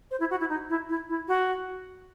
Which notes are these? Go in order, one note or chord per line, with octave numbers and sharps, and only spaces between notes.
C5
E4
F#4
E4
D#4
E4
E4
E4
F#4